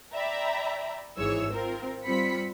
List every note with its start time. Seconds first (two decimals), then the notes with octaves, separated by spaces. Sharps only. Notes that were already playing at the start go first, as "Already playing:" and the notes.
0.13 D5 E5 G5 A#5 B5
1.18 G#1 G#2 E3 G#4 C#5 E6
1.51 C4 F4 A#4
2.05 G3 C4 F4 B5 B6 C#7